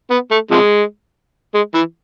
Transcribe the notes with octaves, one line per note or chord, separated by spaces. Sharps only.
B3
A3
C3 F3 G#3
G#3
E3